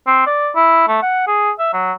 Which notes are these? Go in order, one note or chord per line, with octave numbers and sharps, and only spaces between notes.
C4
D5
E4
A3
F#5
G#4
E5
F#3